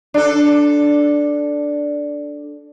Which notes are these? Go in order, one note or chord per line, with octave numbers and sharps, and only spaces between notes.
D4 A4